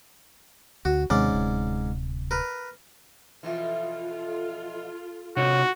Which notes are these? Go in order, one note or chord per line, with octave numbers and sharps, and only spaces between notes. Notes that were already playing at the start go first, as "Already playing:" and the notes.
D2 F#4
D#2 G#2 C3 C#4 D5
D1 C3
A#4 B4
F2 B2 E3 F4 A4
C3 D#4 F#4 C#5